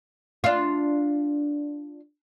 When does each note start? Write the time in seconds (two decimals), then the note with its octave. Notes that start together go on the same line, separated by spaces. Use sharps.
0.44 D4 F4